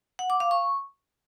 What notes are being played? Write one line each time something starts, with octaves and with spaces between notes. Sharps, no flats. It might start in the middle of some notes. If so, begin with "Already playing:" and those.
F#5
D6
F5
C#6